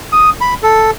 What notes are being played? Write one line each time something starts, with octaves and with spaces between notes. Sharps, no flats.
D#6
B5
A4